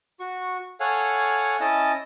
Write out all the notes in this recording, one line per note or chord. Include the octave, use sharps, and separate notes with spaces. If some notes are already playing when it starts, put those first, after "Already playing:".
F#4 C#6
A4 C#5 F5 F#5 G#5
C#4 E4 D#5 A5